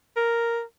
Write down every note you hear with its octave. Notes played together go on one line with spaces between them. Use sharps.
A#4